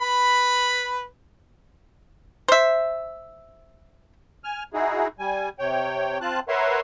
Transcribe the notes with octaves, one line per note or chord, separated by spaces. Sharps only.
B4 B5
C5 E5
G#5 F6
D#4 E4 F#4 G#4
G3 G#5
C3 C#5 G5
C4 F4 A5 F#6
A#4 B4 C#5 E5 F#5 C6